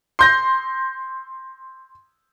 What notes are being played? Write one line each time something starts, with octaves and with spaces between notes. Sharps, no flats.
C6 G6 A#6